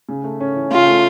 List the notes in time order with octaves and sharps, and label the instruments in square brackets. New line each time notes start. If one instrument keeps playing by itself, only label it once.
[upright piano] C#3
A3
C#4
E3
[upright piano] C#3 [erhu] F4
[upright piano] A3